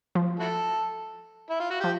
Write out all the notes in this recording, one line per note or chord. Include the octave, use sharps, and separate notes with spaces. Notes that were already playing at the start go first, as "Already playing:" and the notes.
F3
E4 F#4 A4
E4
F4
F#4
F3 G4